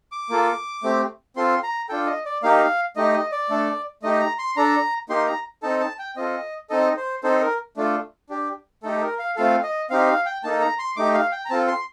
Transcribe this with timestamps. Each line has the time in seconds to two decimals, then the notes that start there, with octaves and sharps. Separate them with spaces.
0.12 D6
0.30 A#3 F4 A4
0.83 A3 C4 G4
1.36 C4 F4 A4 C6
1.63 A#5
1.89 D4 F4 A4 G5
2.07 D#5
2.25 D5
2.43 A#3 D#4 G4 F5
2.96 A3 D#4 G4 D#5
3.14 D#5
3.32 D5
3.50 A3 D4 A4
4.03 A3 D#4 G4 D#5
4.20 A#5
4.39 C6
4.57 D4 A4 A#5
5.09 A#3 D#4 G4 C6
5.27 A#5
5.63 C4 D#4 A4 A5
5.81 A5
5.99 G5
6.17 C4 F4 A4 D#5
6.70 C4 D#4 A4 D#5
6.97 C5
7.23 C4 D#4 A4 C5
7.41 A#4
7.77 A3 D4 F4 A4
8.29 D4 G4
8.83 A3 D#4 G4 A4
8.98 A4
9.02 A#4
9.19 F5
9.36 A3 C4 F4 A4 F5
9.63 D#5
9.90 C4 D#4 G4 F5
10.08 F5
10.26 G5
10.44 A#3 D#4 A4 A5
10.62 A#5
10.79 C6
10.96 A3 D#4 G4 D6
11.14 F5
11.32 G5
11.45 A#5
11.50 C4 F4 A4 A5
11.68 C6